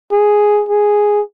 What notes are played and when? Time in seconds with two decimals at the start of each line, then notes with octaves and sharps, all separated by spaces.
0.12 G#4
0.69 G#4